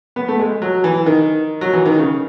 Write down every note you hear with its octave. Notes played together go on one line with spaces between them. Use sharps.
B3
A3
G#3
F#3
E3
D#3
F#3
E3
D#3
C#3